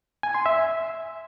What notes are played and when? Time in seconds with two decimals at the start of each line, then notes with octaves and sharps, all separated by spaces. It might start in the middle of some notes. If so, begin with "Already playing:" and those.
0.23 G#5
0.34 C6
0.46 E5